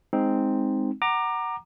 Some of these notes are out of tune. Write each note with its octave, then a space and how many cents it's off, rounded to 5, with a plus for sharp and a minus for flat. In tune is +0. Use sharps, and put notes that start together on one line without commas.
G#3 +0 C4 +0 D#4 +0
F#5 +20 A#5 +0 D6 +25